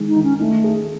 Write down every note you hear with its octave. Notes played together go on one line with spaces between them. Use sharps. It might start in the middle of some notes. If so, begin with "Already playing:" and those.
Already playing: D#3 G#3
D#4
D#3
C#4
A3 D#4
G#4